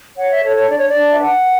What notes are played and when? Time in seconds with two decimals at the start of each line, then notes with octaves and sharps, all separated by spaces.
0.17 C#5 F#5
0.30 E5
0.43 A4 C#5
0.56 C#5
0.69 D4 D5
0.78 C#5
0.88 D5
0.95 D4
1.11 E5
1.21 B4 F#5